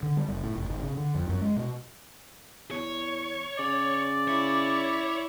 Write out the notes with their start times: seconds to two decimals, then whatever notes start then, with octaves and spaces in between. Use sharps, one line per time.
0.03 D3
0.17 G3
0.28 F#1
0.43 A2
0.56 F1
0.69 G#1
0.83 C#3
0.97 D3
1.15 F2
1.29 F#2
1.41 G#3
1.56 B2
2.71 E2 C#5
3.59 C#3 D5
4.28 E4 C#5